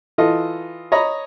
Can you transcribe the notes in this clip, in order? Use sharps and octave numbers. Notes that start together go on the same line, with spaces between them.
E3 F4 A4 D#5
C#5 D#5 A#5 B5